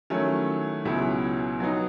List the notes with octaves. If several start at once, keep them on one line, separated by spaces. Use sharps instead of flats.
D#3 F#3 A3 C#4 E4
C#2 B2 F#3 C#4 E4
F#3 B3 D#4